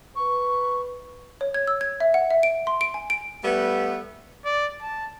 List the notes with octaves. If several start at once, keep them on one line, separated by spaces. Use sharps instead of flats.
B4 C#6
C#5
G#6
E6
G#6
E5
F#5
E5
D7
C6
D7
G#5
D7
G3 A3 B3
D5
A5